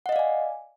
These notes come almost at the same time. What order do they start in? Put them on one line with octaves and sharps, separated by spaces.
F#5 D#5 F5 D5 G#5